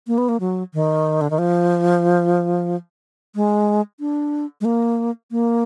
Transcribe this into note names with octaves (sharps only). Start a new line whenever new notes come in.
A#3
B3
A#3
F#3
D#3
D3
D#3
F3
G#3
D4
G#3
A#3
A#3